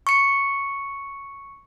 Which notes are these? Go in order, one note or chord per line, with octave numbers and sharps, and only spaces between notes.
C#6 C#7